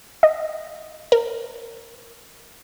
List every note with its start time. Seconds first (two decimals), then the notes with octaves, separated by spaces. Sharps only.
0.23 D#5
1.12 A#4